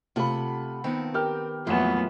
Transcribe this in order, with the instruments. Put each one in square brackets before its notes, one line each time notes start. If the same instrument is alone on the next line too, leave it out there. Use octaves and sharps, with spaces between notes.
[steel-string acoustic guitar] C3 A3 F#5 [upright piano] F4 A4 B5
[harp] D#3 B3 [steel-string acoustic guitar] C4
[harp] G4 [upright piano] A#4 G5 F6
[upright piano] F2 E7 [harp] A#2 E3 F4 [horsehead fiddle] F#3 B3 [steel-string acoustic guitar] A3